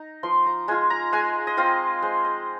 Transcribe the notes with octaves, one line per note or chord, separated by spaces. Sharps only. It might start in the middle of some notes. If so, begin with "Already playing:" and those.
Already playing: D#4 A#5
F3 C6
A#5
G#3 F4 G#5
A#5
G#3 G#5
D#5
C4 F4 F5
G#3 C5
D#5